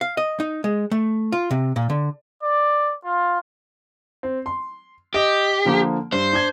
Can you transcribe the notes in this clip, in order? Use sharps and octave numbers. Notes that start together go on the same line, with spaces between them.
F5
D#5
D#4
G#3
A3
F4
C3
A#2
D3
D5
F4
C4
C6
G4 D#5
D3 F3 A#3
G2 C5
D4 G#6